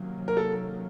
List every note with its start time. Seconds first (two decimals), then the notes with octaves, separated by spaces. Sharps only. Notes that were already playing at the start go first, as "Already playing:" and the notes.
Already playing: C3 D#3 F#3 A#3 C#4
0.28 A#4
0.37 A4